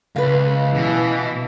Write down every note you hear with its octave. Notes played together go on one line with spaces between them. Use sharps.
C#2 B4 F5
B2 E3